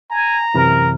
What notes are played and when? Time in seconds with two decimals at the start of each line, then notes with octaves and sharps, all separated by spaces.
0.11 G#5 A#5
0.55 F#2 C3 E3 A#4